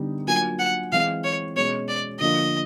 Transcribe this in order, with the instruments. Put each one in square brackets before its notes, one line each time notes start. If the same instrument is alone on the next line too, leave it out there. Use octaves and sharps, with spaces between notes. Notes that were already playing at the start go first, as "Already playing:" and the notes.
Already playing: [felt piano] D3 G3 B3 D#4
[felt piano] F#3 A#3 D4 F4 [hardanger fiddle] G#5
[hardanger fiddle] F#5
[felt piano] E3 G#3 C4 [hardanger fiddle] F5
[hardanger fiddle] C#5
[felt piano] B2 G#3 C#4 [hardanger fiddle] C#5
[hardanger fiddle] D5
[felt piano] D3 F3 A#3 D4 F4 [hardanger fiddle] D#5